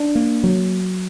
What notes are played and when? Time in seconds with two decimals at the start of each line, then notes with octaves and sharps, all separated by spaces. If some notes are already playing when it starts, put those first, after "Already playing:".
Already playing: D4
0.15 A#3
0.44 F#3